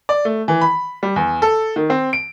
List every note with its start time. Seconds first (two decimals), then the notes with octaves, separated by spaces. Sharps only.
0.09 D5
0.25 A3
0.48 E3
0.61 B5
1.03 G3
1.16 E2
1.42 A4
1.76 D#3
1.90 C4
2.13 D7